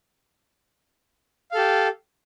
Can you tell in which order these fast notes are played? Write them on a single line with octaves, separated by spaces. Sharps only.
F5 A4 G4